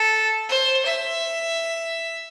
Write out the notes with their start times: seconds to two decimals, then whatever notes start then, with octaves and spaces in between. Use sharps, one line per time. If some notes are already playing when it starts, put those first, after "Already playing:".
Already playing: A4
0.49 C5
0.85 E5